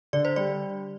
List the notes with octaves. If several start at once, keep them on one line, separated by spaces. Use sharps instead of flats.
D3 D5
C5
G3 D5